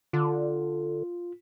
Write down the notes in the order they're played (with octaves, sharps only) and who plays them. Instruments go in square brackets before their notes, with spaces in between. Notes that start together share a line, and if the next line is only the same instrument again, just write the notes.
[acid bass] D3 [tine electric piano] F4